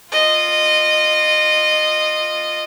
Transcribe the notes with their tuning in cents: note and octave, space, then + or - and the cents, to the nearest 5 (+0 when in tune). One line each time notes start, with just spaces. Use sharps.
F4 +0 D#5 -20